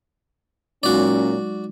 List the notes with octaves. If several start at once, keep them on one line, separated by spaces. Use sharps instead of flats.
A#2 F#3 G#3 C#4 D#4 F#4 D5